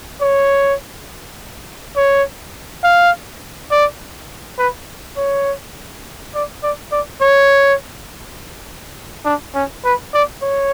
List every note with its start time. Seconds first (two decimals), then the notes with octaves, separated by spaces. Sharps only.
0.21 C#5
1.96 C#5
2.84 F5
3.71 D5
4.58 B4
5.17 C#5
6.34 D5
6.63 D5
6.92 D5
7.21 C#5
9.25 D4
9.54 C#4
9.84 B4
10.14 D5
10.42 C#5